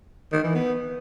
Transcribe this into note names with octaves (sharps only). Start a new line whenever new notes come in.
D#3
E3
B3